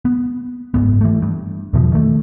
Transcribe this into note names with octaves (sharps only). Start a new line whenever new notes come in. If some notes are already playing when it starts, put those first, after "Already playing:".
B3
F#1 D#2 G#2 B3
E3 A3
G2
E2 B2 E3 F3
D#3 A3